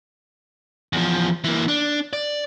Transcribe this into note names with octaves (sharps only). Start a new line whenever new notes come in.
E2 F3
E3 A#3
D4
D5